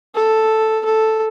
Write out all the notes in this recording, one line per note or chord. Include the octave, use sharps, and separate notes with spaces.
A4
A4